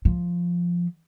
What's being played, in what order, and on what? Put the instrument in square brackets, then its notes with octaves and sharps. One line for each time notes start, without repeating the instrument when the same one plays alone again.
[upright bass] F3